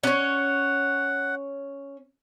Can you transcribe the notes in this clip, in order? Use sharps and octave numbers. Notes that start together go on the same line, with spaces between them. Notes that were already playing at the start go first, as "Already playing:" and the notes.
C#4 C#5 F#5